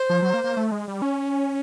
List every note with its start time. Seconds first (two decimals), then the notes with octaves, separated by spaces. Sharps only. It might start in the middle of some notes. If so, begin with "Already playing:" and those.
Already playing: C5
0.09 F3
0.22 F#3
0.34 A#3
0.44 A#3
0.57 A3
0.72 G#3
0.88 G3
1.02 C#4